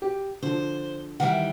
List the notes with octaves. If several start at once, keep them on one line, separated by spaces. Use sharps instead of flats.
G4
D3 F3 C5
D#3 E3 G3 F#5